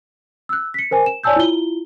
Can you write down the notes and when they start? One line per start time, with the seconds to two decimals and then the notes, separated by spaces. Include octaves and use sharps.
0.49 E6 F#6
0.74 B6 C#7
0.91 A#4 C5 G#5
1.06 E7
1.24 C#5 D5 G#5 A5 E6 G6
1.36 E4 F4 G7